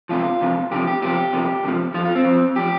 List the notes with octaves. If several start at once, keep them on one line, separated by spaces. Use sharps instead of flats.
D2 C3 F3 F4
D2 C3 F3
D2 C3 F3 G4
G4
D2 C3 F3 G4
D2 C3 F3
D2 C3 F3
F2 F3 F4
F4
C4
F2 F3
F3 G4